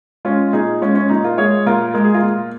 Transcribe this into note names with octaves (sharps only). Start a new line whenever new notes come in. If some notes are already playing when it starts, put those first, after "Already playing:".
G#3 C#4 F4
A#2 D#4 G#4
G#3 C#4 F4
C#4
A#2 D#4
F4 A#4
G#3 G#4 C#5
A#2 F4 A#4
G#3 A#4
G#4
F4 A#4
A#2